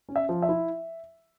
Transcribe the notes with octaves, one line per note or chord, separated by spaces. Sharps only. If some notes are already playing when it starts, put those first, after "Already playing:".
C#4
E5
F3
E5
E4